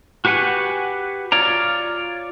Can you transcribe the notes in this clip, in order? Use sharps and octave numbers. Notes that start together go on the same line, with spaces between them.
F#4 G4 B4 F#5 G#5
F4 C#5 D5 A#5